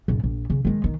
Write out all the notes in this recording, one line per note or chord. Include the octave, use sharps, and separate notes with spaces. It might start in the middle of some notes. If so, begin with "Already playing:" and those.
F#1 A#2
A#1
C#3
D#3 G#3
D#3